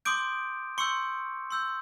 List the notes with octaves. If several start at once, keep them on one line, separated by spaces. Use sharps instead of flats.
C6 D6 D#6 G6 D7
C6 C#6 E6 G6 C#7
C6 E6 G6